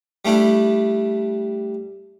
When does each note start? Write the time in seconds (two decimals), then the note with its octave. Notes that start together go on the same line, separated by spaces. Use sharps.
0.25 G3 A3 D4 E4